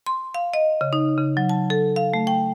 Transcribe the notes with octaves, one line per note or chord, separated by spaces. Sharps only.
C6
F5
D#5
C#3
D#4
C#3
F#3
A5
A4
F5
A3
G5